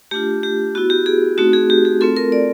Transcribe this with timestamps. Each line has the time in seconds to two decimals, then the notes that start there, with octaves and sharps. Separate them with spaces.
0.11 A3 D4 F4 G4
0.43 G4
0.75 B3 E4 F#4
0.90 G4
1.06 G#4
1.38 A3 C4 D#4 F#4
1.53 G#4
1.70 G4
1.85 G#4
2.01 A3 C4 F4 A4
2.17 A#4
2.32 D5